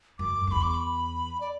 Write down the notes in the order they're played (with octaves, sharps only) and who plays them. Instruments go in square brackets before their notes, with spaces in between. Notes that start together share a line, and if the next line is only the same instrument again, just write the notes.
[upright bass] F#2 [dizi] D6
[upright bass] F#2
[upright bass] E2 [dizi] B5
[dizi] D6
B5
D5